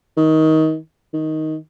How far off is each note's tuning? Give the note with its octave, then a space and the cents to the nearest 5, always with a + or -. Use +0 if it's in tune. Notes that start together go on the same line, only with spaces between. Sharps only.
D#3 +20
D#3 +10